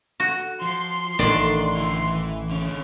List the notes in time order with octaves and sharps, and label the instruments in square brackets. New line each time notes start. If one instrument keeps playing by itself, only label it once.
[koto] F#4
[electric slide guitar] F3 [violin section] C6
[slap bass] A1 A2 [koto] D#3 D5 [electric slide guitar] D4
[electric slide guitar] D3 E4
E3
D3 C#4